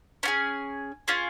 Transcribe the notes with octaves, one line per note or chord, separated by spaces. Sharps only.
C#4 F4 G#4 G#5
C#4 F4 G#4